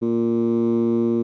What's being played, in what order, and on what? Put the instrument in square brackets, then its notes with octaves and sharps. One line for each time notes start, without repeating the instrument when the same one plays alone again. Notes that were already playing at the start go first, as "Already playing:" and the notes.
[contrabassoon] A#2